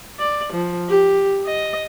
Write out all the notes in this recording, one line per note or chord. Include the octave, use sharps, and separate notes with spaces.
D5
F3
G4
D#5